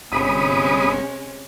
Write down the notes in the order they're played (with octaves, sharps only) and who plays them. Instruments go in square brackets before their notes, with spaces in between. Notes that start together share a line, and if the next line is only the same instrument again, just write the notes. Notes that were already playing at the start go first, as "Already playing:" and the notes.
[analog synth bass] G1 [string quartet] C3 G#3 C#4 [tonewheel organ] B5 D#6